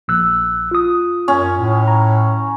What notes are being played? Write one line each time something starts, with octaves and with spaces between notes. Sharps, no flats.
A#1 E6 F#6
F4 D#6
F#2 C#4
A2
A#5